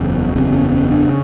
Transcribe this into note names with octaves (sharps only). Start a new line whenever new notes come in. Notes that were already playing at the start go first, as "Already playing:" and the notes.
Already playing: F#1 E2 C#3
F#1 E2 C#3 C4
C#4
C#4
D4
C#3